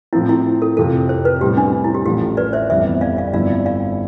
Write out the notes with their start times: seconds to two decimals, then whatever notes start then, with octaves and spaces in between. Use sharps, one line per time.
0.13 A2 F3 C4 E4
0.29 E4
0.62 A4
0.77 F2 C3 F3 A4
1.09 C5
1.25 B4
1.41 A2 G3 C4 G4
1.57 D4
1.84 E4
1.94 G4
2.05 A1 A2 F3 A3 G4
2.37 B4 D5
2.53 C5 E5
2.70 G1 F2 E3 G3 B3 C5 E5
3.01 D5 F5
3.17 D5 F5
3.33 G1 G2 F3 C4 E4 D5 F5
3.66 D5 F5